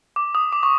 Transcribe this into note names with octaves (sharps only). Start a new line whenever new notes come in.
D6
D#6
D6
C#6